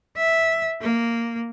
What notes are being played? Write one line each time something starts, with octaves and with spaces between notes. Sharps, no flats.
E5
A#3